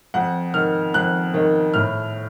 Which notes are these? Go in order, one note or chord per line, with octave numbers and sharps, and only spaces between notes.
F2 F#5
D#3 F6
F2 F#6
D#3
A2 F6